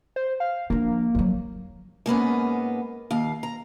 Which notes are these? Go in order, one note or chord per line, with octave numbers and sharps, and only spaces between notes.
C5
F5
F3 A#3 D4
F3 F#3
G#2 A#3 B3 C#4
D#2 F5
A#5